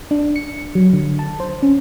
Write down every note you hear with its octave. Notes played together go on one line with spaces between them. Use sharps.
D4
C#7
F#3
D3
A5
C5
C#4